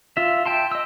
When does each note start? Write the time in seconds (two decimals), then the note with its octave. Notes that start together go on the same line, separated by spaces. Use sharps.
0.17 F4 E5
0.46 E5 G5 A5 C6
0.72 D#5 E6